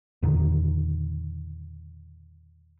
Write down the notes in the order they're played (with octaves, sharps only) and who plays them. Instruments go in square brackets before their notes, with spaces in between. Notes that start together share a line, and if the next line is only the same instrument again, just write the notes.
[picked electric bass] E2 A#2 D3 D#3